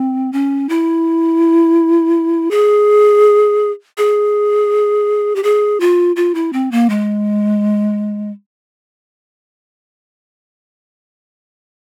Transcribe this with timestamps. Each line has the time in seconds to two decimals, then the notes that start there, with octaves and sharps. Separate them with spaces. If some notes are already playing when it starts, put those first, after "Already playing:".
Already playing: C4
0.33 C#4
0.69 E4
2.51 G#4
3.98 G#4
5.36 G4
5.43 G#4
5.80 F4
6.16 F4
6.35 E4
6.53 C4
6.72 A#3
6.90 G#3